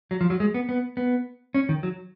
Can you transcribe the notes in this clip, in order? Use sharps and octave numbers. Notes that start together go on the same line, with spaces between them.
F#3
F3
F#3
G#3
B3
B3
B3
C#4
D#3
F#3